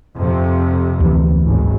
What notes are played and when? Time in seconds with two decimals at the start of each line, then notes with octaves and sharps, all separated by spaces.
0.16 F2 C3
1.00 D2 E3
1.46 G#1 F#2